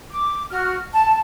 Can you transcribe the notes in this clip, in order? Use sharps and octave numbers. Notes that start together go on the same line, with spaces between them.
D6
F#4 F6
A5